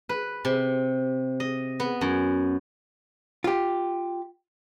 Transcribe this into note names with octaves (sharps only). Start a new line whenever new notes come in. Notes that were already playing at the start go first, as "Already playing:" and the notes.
B4
C3
D#5
B3
F#2
F4 G4